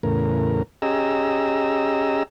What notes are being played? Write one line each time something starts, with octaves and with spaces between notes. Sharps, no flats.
E2 A2 C#3 A#4
C#4 G4 G#4 D#5 A#5 E6